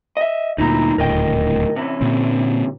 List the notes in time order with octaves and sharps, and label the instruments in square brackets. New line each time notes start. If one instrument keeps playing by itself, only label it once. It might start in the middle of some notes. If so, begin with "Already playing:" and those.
[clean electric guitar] D#5 E5
[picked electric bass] D2 A#2 [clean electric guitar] D#4 E4 A#5
[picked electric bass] D#1 D2 A2 [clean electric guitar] A#4 D#5 G5
[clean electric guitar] C3 E3 C#4
[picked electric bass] A#2 D3 C4